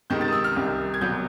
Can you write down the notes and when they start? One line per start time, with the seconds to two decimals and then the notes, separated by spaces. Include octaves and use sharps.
0.10 C#2 C3 D#3 G6
0.21 A6
0.28 D#6
0.32 E6
0.44 F6
0.56 C2 C3 D#3
0.94 G#6
1.01 C2 B2 F#3 G6